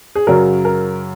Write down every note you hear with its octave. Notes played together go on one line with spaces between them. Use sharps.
G#4
F#2 C#3 F#3 A#4
A#4